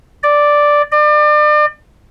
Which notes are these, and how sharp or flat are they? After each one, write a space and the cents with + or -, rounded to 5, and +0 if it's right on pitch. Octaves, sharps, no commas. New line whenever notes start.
D5 +0
D5 +35